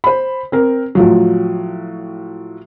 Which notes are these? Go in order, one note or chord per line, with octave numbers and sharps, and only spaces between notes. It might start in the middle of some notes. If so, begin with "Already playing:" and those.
C5 B5
C4 A#4
A2 F3 F#3